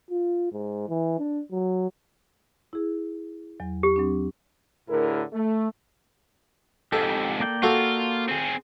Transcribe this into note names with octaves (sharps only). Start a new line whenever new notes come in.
F4
G#2
E3
D4
F#3
E4 G#4
E2 F#3
G4
F#3 C4 D4
D2 A2 D3 E4 G#4 A#4
A3
F2 G#2 G4 A4
A#3 D5 G5
F4 F#4 A4 F5
C4 G#4